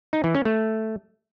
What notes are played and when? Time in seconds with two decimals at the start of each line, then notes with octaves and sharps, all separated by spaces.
0.13 D#4
0.24 E3
0.35 C#4
0.45 A3